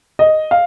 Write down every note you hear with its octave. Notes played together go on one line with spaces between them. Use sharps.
D#5
F5